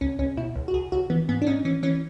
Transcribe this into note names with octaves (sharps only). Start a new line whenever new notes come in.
C#2 C#4
C#2 C#4
B2 E4
C#2
F#4
C#2 G#4
C#2 F#4
E3 B3
G#2 B3
D4
G#2 C#4
E3 C#4
E3 C#4